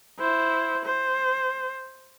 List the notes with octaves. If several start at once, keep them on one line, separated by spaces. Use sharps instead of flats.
E4 C5
C5